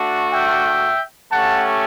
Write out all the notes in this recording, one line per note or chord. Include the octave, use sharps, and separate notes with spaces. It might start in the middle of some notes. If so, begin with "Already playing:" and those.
Already playing: A3 D4 F#4
E5 G5
A3 C#4 G4 F#5 A5